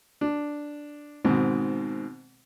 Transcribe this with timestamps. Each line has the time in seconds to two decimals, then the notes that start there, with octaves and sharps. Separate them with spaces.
0.21 D4
1.25 G#2 B2 D#3 C4